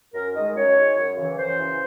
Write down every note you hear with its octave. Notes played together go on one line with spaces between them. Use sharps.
F#2 A#4
D#3 G#3 D#5
F#2 C#5
D#3 G#3
F#2
C#3 E3
F#2 C5
C#3 E3